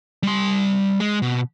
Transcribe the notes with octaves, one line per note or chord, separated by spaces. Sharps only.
G3 C6
G#3
B2